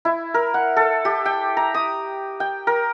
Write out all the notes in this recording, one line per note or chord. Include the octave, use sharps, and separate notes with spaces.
E4
A#4
F#5
A4
G4
G5
A#5
D#6
G5
A#4